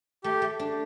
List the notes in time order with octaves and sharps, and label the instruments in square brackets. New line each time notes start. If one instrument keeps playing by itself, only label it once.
[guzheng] A3 [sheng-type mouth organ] G4
[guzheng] A3
D4